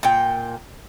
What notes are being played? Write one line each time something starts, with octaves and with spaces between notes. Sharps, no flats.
A#2 G5